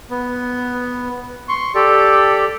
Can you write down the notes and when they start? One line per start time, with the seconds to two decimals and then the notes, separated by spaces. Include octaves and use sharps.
0.10 B3
1.49 C6 C#6
1.75 G4 A4 D5